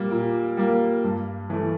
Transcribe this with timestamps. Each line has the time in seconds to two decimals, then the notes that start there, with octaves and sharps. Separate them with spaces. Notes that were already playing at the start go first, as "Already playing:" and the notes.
Already playing: A#2 G3 A#3
0.11 A#2
0.57 G3 A#3
1.04 G2
1.50 E3 A3